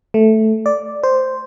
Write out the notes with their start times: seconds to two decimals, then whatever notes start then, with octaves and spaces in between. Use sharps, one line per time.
0.14 A3
0.66 D5
1.03 C5